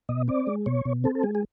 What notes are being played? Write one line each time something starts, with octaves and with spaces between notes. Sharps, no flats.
B2 D#5
C4 D5
G#3
B2 C#5
B2
C4 A4
A4
G#3 G#4
G#4